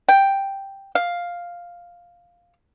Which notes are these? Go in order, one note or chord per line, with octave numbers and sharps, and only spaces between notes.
G5
F5